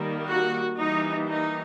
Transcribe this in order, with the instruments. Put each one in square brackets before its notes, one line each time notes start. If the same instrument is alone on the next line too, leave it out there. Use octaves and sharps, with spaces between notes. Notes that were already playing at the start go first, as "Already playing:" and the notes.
Already playing: [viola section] D#3 G3 A#3
F#4
E3 G3 A#3 D#4
D#4